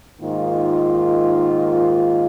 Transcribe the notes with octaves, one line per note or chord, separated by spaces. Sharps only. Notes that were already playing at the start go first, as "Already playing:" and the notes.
G#2 D#3 A#3 F4